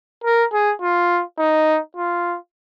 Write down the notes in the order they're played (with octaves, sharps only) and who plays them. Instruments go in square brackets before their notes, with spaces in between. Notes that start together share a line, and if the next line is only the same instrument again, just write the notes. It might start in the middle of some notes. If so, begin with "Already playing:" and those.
[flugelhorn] A#4
G#4
F4
D#4
F4